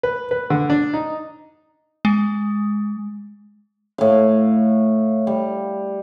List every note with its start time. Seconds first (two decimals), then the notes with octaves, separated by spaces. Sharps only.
0.03 B4
0.31 B4
0.50 D3
0.70 D4
0.93 D#4
2.05 G#3
3.98 A2 F5
5.27 G3